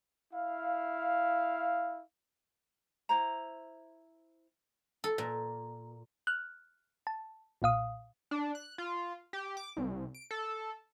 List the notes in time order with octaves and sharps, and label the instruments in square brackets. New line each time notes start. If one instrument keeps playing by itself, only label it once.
[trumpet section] E4 F5
[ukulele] E4 C5 A#5
[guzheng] A4
A#2
[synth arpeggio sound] F6 F#6
A5
B1 A#2 F5 D#6
[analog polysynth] D4
F#6
F4
G4
D6
C2
D7
A4